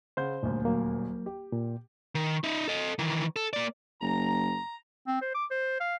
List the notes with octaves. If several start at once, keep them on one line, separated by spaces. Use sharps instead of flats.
C#3 C5 F#5 G6
D#1 D2
F#3 A#3
G4
A#2
D#3
D#4 E5
A4 D#5
D#3 E3
A4
A#3 D5
F#1 A#5
C4
C5
D6
C5
F5